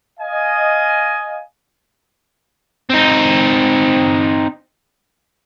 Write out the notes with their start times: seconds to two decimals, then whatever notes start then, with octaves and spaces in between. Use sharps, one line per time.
0.19 D#5 F5 G#5
2.90 C4 D#4